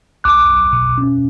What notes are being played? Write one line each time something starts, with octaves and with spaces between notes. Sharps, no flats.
B1 D6 F#6
B1
B2
C#4